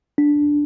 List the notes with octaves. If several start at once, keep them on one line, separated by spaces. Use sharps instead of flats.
D4